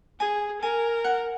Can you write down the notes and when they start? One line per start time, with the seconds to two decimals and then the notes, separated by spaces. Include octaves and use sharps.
0.20 G#4 G#5
0.62 A#4 G#5
1.04 F#5